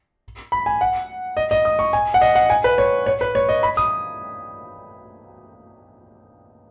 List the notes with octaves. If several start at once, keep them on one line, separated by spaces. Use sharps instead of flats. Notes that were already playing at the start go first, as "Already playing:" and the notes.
B5
G#5
F#5
D#5
D#5
D#6
C#6
G#5
F#5
D#5
F#5
G#5
B4
C#5
C#5
B4
C#5
D#5
B5
D#6